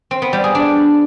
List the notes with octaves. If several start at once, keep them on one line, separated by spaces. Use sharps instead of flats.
C4
B3
G3
G#4
D4